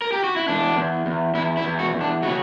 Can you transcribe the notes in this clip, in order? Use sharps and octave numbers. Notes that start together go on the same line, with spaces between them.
A#4
G4
F#4
E4
E2 D4
E2
E2
E2 E4
E4
E2
F#4
E2
D4
C#3 F#4